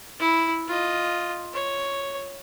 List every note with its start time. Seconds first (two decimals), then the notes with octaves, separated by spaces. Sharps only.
0.20 E4
0.68 F4 D#5
1.54 C#5